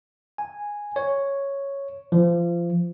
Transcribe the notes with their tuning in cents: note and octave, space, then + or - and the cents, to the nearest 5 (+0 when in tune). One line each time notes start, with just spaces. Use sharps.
G#5 -5
C#5 +0
F3 -25